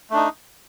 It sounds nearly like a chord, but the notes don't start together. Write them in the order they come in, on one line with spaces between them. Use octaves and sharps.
A3 D4 D#4